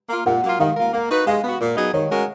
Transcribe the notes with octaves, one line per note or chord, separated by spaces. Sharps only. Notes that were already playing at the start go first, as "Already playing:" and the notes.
A#3 F4
A#2 F#5
F#3 A#3 F4
D#3 F5
A#3 F4 A#4
A#3
D#4 F#4 B4
G#3 F5
B3 F#4
A#2
F#3 B3 D#4 G#4
D#3 C#5
G#3 C#4 F#4 A#4